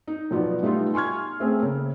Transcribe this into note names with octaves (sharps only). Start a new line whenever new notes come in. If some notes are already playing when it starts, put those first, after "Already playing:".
D#4
B1 F3 B3 D5
G3 A3 B3 D#4 F4
G#5 C6 C#6 F6 G#6
A3 C4 C#4 G#4
C#3 A#3